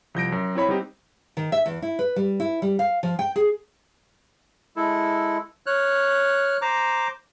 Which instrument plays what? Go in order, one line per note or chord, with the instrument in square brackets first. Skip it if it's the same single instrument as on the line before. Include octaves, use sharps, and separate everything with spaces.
[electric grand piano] C2 F3 G6 A#6 D7
F#2
C4 E4 C#5 B5
G3 B3 C4 D#4 G4
[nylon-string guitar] D#3
E5
E2
E4
B4
G3
E4
G3
F5
F3
G5
G#4
[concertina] G#3 E4 A4
C#5 F6 F#6
C5 A#5 D6